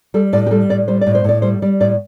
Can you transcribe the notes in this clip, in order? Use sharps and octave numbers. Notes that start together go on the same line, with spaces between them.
G3 A4
A2 D5
G4
G3 A4
A2 D5
G3 C5
D5
A2
C5
A2 D5
G3 C5
G3 D5
A2 D5